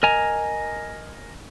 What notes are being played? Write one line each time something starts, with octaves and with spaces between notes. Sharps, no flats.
A#4 D#5 G#5 A#5